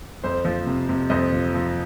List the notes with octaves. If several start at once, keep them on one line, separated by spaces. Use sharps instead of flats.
F2 C5
F3
C3
C3
F2 C5 D#5
F3
F3